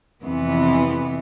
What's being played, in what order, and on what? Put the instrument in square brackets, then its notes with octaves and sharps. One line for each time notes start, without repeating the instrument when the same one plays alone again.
[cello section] F2 C3 E3 B3